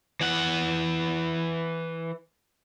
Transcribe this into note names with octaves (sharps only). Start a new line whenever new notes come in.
E3 F#5